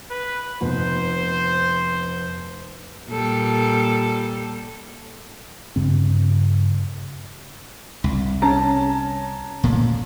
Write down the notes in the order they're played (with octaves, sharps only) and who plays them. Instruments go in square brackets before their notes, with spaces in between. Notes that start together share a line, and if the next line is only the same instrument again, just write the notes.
[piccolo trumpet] B4
[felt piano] F1 B3 [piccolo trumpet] C5
[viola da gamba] A#2 G3 A4
[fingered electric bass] G2 C#3 C4
[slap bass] C2
[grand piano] C#4 A5 A#5
[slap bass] A#2 A3